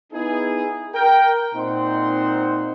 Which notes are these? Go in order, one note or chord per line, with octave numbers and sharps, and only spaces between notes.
B3 D#4 E4 G#4
A#4 G5
A#2 C4 D#4 C5 F#5 C6